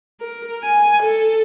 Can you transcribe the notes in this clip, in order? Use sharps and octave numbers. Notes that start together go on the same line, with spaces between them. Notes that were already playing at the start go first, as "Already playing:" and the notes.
A#4
G#5
A4